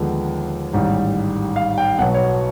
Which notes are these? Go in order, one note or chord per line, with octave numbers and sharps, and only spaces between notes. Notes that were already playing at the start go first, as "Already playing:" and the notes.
Already playing: D#2 D3 F3 G#3 B3
A1 G#2 D#3 G3
F5
G5
B1 B2 F#3 B3 F#5
C#5